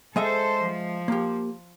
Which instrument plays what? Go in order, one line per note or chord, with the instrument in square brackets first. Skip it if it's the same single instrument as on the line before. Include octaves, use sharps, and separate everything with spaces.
[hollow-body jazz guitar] G#3 D#5 E5 [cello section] A4 C5
[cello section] F3
[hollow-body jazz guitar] A#3 G4